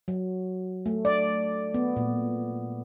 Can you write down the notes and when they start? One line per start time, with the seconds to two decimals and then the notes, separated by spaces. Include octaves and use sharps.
0.08 F#3
0.86 A3
1.05 D5
1.74 B3
1.96 A#2